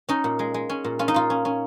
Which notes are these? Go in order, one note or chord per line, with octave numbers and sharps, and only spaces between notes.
C#4 D#4
A#2
G#3
G#3
C#4
A#2
C#4 F4
D#4
A#2 F4
C#4
C#4